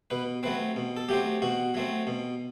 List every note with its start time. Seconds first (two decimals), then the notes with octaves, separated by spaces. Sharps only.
0.10 B2 B4
0.43 F#3 A3 C4 B4
0.76 B2
0.97 A4
1.09 F#3 A3 C4 G4
1.42 B2 F#4
1.74 F#3 A3 C4
2.07 B2